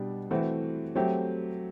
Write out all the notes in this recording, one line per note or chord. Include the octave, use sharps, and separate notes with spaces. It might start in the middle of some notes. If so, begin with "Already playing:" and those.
Already playing: B2 G3 D4
E3 A3 C4 F#4
F#3 A3 C4 G4